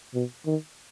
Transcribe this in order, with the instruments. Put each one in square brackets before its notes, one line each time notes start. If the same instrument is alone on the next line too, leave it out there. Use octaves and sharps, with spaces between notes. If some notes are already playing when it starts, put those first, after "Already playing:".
[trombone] B2
D#3